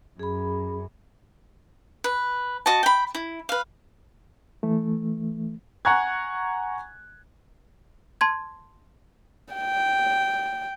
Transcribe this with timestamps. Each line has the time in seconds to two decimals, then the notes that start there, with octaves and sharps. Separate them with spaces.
0.19 F#2 G#4 B5
2.04 B4
2.66 F#4 D#5 A5
2.83 G5 B5
3.15 E4
3.49 B4 F5
4.63 E3 A3
5.85 F#5 G#5 A#5 C#6 F#6 G#6
8.21 A5 C6 G#6
9.53 G5